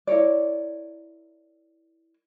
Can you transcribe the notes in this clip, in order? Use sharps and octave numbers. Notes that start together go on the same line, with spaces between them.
E4 A#4 C#5 D5